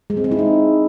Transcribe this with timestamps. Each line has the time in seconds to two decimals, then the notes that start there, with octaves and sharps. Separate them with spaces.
0.10 G#3
0.17 C4
0.24 G#3
0.31 E4
0.39 D#4